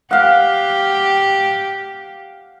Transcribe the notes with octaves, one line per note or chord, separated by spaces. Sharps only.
G4 F5 F#5